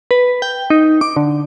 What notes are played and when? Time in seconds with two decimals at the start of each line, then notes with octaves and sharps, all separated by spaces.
0.11 B4
0.42 G5
0.70 D#4
1.01 D6
1.16 D3